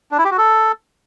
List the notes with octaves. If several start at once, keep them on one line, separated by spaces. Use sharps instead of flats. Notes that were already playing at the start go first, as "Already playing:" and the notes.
D4
E4
G4
F#4
A4